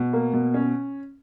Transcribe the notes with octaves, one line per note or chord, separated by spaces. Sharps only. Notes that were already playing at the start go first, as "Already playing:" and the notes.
Already playing: B2
A#3
B2
C#4